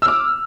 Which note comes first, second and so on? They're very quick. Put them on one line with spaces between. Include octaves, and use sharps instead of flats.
E6 F6 D6